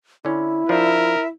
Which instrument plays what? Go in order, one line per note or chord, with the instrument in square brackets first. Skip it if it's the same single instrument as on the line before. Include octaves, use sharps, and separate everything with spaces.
[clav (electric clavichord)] D3 C#4 [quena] E4
[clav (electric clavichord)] F3 D4 [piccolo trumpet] A#4 [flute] E5